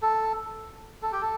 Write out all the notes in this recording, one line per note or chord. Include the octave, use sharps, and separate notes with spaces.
A4
A4
G4
A4